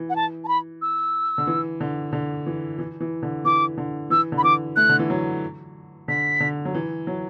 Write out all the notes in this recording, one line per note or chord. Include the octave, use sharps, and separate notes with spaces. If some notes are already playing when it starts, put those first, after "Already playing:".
Already playing: E3
F#5
A5
A5
B5
E6
D3
E3
D3
D3
E3
E3
E3
D3
E3 D6
D3
E3 E6
D3
B5
E3 D6
A3 F#6
D3
E3
F#3
D3 B6
D3
F#3
E3
F#3